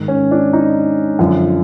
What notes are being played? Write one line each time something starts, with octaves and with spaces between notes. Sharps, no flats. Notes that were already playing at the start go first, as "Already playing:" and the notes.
Already playing: G#2 D#3
C#4
D4
D#4
F#2 D3 F3